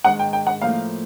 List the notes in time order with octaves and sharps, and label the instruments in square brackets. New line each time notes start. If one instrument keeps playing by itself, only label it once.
[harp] G#2 D#3 G#3 [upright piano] F#5
[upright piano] G5
G5
F#5
[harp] A2 F3 A#3 [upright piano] F5